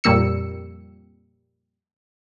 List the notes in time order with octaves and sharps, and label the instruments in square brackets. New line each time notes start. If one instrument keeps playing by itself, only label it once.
[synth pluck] F2 A#2 G3 A#3 E6 C#7